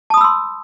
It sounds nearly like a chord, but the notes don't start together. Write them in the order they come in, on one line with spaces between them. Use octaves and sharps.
A5 D#6 B5 E6 C6